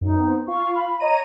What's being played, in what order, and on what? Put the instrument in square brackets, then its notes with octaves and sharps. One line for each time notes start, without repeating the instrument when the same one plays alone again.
[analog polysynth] F#2 [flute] D#4
[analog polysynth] B3 C4
[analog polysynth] F4 F5 [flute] C#6
[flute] B5
[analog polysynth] C#5 A#5 D#7 [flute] D#5